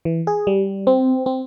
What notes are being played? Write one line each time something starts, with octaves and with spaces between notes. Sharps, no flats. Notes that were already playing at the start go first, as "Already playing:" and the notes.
E3
G#4
G3
C4
C4